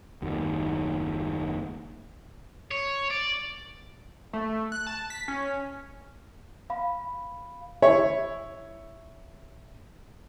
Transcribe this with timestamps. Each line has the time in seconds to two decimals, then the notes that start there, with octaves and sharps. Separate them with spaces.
0.22 F#1 D#2
2.71 C#5
3.11 D5
4.33 A3
4.72 F#6
4.87 A5
5.10 B6
5.28 C#4
6.70 F5 B5
7.82 E4 C#5 E5